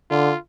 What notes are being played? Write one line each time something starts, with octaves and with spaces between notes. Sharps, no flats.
D3 F4